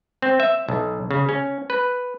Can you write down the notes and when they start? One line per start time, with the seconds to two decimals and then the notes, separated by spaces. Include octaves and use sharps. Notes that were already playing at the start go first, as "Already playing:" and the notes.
0.22 C4
0.40 E5
0.68 B1
1.11 C#3
1.29 C#4
1.70 B4